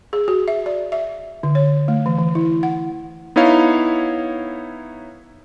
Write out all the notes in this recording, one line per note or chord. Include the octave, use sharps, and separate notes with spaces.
G#4
F#4
E5
D5
E5
D3
C#5
A3
E3
E3
E4
F#5
B3 D#4 E4 C#5 F5